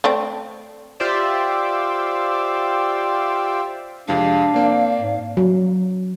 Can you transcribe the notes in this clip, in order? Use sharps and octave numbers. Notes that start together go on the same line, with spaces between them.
A3 C4 D5
F4 G4 C5 D5 E5
F2 C3 G#3 D4 F5
A#3 C4 D5
G#2
F#3